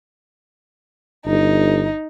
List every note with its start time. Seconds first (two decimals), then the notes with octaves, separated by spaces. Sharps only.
1.26 G1 D#4